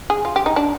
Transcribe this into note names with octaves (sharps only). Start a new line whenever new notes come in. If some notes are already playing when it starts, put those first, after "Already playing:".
G#4
F4
G4
D#4
D4